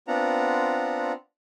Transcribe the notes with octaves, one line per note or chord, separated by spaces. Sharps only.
B3 C4 D4 F4 F#5 A#5